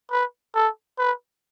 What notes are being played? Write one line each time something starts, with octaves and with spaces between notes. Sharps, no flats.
B4
A4
B4